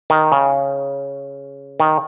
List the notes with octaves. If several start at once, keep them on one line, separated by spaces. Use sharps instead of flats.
D#3
C#3
D#3